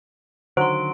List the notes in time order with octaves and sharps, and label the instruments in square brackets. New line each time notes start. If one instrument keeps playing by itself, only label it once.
[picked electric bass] D3 D#3 [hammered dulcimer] F#3 [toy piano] C5 [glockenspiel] C6 D7